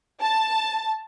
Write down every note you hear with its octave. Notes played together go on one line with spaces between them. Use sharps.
A5